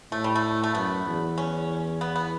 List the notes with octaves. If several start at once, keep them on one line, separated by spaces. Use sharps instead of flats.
A2 A3
G3
A3
A3
F#2 B3
E2
C#4
B3
B3